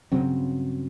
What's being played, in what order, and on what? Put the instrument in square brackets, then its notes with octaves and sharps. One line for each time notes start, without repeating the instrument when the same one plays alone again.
[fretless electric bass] G2 C#3 F#3 C4